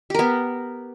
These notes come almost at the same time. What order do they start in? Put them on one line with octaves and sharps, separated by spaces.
G4 A#4 B3